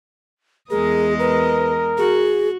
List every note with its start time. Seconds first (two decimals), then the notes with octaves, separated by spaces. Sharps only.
0.70 E2 G#3 G#4 A#4 D#5
1.20 A#4 B4
1.98 F#4 G#4